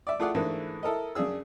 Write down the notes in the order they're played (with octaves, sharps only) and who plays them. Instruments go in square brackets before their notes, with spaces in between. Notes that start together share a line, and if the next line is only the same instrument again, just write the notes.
[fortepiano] D5 E5
A3 E4 F4 G#4 D5 F#5
G#2 D3 E3 A3 A#3
E4 A4 A#4 D#5
F#2 C#3 D4 G#4 E6